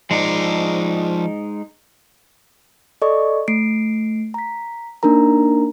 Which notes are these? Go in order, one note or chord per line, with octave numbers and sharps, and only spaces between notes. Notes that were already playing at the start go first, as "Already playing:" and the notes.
F3 G#3 D#4 D5
A4 D5 D#5 C#6
A3 C7 D7
A#5 B6
A#3 D4 D#4 A#4 A#5